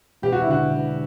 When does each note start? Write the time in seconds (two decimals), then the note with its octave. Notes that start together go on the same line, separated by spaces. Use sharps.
0.22 E1 G4
0.32 F#4
0.41 E4
0.47 D3 F#4
0.71 E1